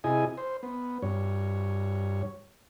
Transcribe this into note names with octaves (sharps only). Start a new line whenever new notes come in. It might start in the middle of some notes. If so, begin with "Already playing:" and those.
C3 E4 G#4 D#5 G#5
C5
B3
G2 C#5